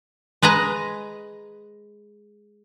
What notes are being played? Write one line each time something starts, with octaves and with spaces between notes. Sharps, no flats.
G#3 B4 D#5 A#5